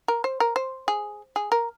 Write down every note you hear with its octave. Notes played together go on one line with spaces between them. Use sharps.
A#4
C5
A#4
C5
G#4
G#4
A#4